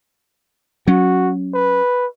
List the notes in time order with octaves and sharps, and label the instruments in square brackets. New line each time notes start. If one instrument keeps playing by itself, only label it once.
[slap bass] F#3 C#4 [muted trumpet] F#4
[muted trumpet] B4